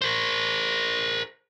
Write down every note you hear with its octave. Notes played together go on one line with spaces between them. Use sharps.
A#4 C5